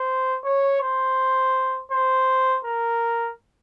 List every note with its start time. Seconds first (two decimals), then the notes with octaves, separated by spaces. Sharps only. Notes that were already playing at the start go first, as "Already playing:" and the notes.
Already playing: C5
0.44 C#5
0.82 C5
1.91 C5
2.64 A#4